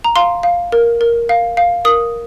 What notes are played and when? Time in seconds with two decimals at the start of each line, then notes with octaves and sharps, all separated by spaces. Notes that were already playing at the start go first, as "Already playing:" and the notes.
0.04 A#5
0.16 F5 C6
0.43 F5
0.72 A#4
1.01 A#4
1.29 F5
1.57 F5
1.85 A#4 D#6